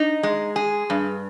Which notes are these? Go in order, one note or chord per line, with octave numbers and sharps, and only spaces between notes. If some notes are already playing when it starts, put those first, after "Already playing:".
Already playing: D#4
G#3
G#4
G2